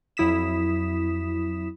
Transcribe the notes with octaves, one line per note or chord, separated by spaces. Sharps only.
F2 F#3 E4 D#6 B6 E7